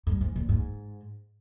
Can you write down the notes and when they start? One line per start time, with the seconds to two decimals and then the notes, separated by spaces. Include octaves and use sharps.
0.07 G2
0.21 G#2
0.36 A#2
0.49 G#2